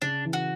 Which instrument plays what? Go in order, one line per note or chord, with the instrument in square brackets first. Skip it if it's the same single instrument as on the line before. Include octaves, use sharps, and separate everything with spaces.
[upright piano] C#3 [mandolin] D4
[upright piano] E3
[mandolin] F#4